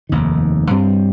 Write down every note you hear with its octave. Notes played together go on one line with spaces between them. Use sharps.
F1 D#2 D#3
G2 G3 C4